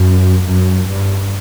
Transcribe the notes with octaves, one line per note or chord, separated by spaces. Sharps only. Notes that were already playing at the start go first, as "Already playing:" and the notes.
Already playing: F#2
F#2
G2